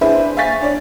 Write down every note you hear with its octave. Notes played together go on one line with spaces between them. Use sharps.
D4 E4 G#4 B4 C5 E5
E5 F5 G#5 C#6 A6 B6
D4 C#5 D5